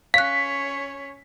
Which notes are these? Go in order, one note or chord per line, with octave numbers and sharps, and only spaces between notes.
C#4 C#5 F5 F#6 B6